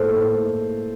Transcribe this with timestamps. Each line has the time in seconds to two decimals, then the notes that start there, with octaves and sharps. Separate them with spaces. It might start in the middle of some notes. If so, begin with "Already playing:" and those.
Already playing: A2 A#3 A4 C5
0.16 A2